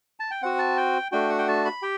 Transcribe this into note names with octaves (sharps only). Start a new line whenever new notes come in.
A5
G5
C4 F#4 F#5
A5
G5
A3 D4 F#4 G5
F#5
G5
A5
B5
G4 G5